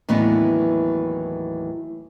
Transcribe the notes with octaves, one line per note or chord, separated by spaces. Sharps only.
D#2 A2 E3 F#3 B3 D4